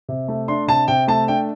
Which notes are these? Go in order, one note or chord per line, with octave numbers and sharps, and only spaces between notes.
C3
A3
D4 C6
C3 A5
C3 G5
A3 A5
D4 G5